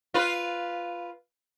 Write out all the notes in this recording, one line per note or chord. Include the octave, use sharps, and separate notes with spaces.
F4 B4